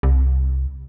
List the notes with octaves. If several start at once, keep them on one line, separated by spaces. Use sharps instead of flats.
C2